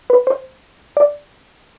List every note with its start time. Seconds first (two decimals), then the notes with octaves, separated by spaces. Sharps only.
0.10 B4
0.27 C5
0.97 D5